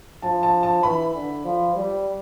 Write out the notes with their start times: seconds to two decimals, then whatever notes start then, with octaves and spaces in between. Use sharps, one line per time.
0.22 F3 A5
0.43 A5
0.63 A5
0.83 E3 B5
1.14 D3
1.45 F3
1.75 G3